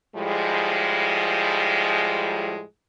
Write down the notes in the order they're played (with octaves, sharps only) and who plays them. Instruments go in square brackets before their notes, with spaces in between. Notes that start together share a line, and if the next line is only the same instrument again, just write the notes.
[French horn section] A2 F3 G3 G#3